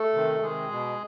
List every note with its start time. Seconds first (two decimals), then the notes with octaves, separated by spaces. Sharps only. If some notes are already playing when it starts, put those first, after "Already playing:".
Already playing: A3 A4
0.13 C3 D#3
0.42 C3 D#3 G#3 G#4
0.71 B2